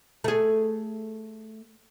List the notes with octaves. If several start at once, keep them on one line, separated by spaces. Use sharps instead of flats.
A3 G#4